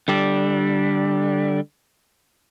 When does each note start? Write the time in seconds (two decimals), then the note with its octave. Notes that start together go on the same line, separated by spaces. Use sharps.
0.08 D3 G3 D4